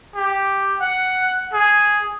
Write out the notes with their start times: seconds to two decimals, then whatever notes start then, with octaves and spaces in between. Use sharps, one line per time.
0.15 G4
0.80 F#5
1.53 G#4